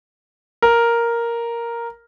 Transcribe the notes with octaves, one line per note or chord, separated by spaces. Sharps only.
A#4